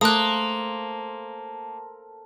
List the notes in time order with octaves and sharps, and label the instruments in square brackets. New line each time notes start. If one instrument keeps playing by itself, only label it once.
[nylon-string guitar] A3 [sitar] A#3 [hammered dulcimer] A4 C5 [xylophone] D#6 F#6